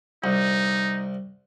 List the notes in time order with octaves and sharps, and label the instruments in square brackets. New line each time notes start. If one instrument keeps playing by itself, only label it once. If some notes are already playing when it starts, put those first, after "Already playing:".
[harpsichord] C2 [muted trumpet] D#4